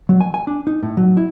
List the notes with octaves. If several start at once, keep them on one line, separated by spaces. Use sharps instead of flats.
F#3
G#5
G#5
D4
D#4
A2
F#3
E4